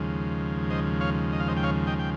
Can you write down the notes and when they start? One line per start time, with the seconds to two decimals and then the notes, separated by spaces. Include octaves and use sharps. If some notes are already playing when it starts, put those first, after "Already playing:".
Already playing: D#2 C#3 F3 G#3
0.70 C5 D#5
1.01 C#5 F5
1.33 D#5
1.40 F5
1.48 C5 D#5
1.57 G5
1.63 C#5 F5
1.87 D#5 G5
1.99 G5